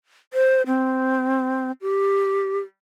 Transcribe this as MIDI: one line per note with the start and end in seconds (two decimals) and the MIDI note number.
0.33 0.62 72
0.67 1.72 60
1.82 2.59 67